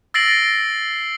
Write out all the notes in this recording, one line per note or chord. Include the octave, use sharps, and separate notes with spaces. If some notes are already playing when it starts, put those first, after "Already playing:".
E6 A6 A#6 C7 D7 F#7